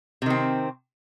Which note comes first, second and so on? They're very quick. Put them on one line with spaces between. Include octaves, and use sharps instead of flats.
C3 D#3 C4